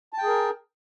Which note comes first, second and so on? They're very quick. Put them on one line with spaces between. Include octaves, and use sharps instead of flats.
A5 G5 G#4 A#4